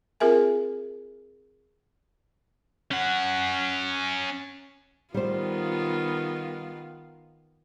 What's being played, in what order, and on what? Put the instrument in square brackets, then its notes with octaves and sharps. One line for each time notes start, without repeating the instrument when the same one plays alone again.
[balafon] C4 F4 G#4 A#4 E5 G#5
[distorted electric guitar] C#4 F#5
[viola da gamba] D#3 B3 F4 [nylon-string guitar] G3 C5